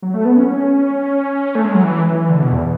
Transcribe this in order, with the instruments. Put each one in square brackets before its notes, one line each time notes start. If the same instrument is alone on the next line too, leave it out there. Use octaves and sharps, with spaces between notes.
[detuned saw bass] F#3
A3
B3
C#4
C#4
A3
G#3
F#3
E3
E3
D3
B2
E2